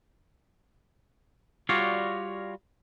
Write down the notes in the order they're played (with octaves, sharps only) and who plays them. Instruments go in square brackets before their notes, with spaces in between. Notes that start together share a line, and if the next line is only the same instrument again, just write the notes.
[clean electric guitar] G3 F4 F#4 C#5 D5 F5